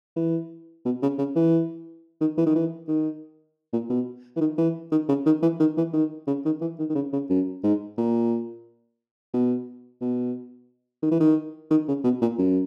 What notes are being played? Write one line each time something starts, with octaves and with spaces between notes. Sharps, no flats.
E3
B2
C#3
C#3
E3
D#3
E3
D#3
E3
D#3
A#2
B2
E3
D#3
E3
D#3
C#3
D#3
E3
D#3
E3
D#3
C#3
D#3
E3
D#3
D#3
C#3
C#3
F#2
G#2
A#2
B2
B2
D#3
E3
D#3
D#3
C#3
B2
A#2
F#2